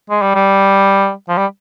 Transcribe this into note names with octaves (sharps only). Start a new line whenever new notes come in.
G#3
G3
G3
F3
G3